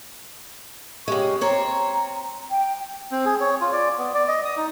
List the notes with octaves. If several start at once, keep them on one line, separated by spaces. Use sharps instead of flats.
C#3 G#3 G4 C#6
C4 C#5 A#5
G5
C4
G#4
C#5
F4
D5
B3
D5
D#5
D#6
D#4